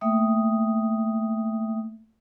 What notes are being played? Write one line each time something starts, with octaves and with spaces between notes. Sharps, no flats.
A3 A#3 E5 G5 D#6